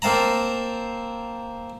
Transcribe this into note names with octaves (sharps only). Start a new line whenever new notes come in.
A#3 C4 F5 A5 A#5